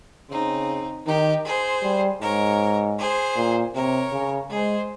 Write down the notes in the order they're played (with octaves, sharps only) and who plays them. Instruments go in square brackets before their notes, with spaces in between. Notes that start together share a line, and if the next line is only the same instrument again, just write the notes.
[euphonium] C#3 [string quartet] C4 D#4
[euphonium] D#3 [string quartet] D#4 G4
[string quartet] G#4 C5
[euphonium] G3
[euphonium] G#2 [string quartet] A#4 C#5
[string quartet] G#4 C5
[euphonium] A#2
[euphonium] C3 [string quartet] A#4 C#5
[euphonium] C#3
[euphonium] G#3 [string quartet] G#4 C5